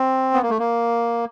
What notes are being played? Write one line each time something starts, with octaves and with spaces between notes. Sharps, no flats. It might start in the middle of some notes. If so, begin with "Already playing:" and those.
Already playing: C4
B3
A#3
A3
A#3